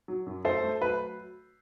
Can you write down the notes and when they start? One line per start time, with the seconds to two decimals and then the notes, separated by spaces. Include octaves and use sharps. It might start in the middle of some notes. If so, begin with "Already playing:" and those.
0.08 F#3
0.26 F#2
0.45 A3 A4 C5
0.63 A3
0.81 F#3 B4